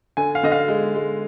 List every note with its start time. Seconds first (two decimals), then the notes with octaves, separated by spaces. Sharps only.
0.17 D3 G#5
0.35 F5
0.43 D3 D#5
0.52 F5
0.68 G#3
0.95 G#3